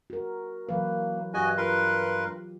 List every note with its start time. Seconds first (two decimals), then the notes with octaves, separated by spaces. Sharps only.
0.10 F#4 A#4
0.69 E3 F#3 A#3 B4
1.34 G2 F#4 G4 D#5 G#5 F#6
1.58 F4 A#4 B4 C6